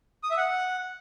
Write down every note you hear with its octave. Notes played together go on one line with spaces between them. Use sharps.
D#6
E5
F#5